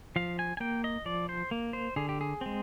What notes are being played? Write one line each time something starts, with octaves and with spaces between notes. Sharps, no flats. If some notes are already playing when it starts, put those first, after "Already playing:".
F3 F5
G#5
G#5
A#3 G5
D#5
F3 D5
C5
A#3
C5
D3 G#4
G4
G#4
G#3 C4